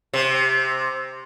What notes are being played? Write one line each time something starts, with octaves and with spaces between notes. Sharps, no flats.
C3